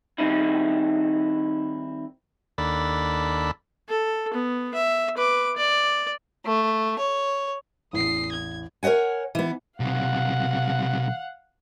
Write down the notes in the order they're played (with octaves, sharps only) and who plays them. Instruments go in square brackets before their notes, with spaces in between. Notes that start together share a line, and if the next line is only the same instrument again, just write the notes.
[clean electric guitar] D#3 G3 C4 D#4 E4
[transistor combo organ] D#2 D4 A4 B5
[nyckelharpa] A4
B3
E5
B4 D6
D5
[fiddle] A3
C#5
[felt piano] A1 E2 [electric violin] D#6 C7
[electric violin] G#6
[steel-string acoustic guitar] A#4 C#5 D#5 F#5 G#5
E3 B3
[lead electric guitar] B1 C3 [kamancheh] F5 F#5